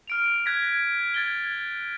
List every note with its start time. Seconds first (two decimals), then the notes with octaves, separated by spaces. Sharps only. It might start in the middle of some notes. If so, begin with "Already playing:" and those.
0.08 F6 D7 F7
0.46 F#6 G#6 A#6 B6
1.14 G#6 A6 G7